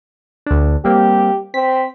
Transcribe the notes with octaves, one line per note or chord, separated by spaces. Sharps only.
D2 D4
G3 A#3 C4 G4
C4 B6